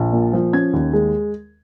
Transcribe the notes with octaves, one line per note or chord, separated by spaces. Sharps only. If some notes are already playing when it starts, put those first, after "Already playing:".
Already playing: A#1
A#2
F3
C#4 G#6
D#2
G#3